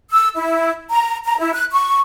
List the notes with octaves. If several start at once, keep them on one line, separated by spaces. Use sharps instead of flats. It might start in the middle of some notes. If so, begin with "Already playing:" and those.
E6
E4
A#5
A#5
E4
F#6
C#6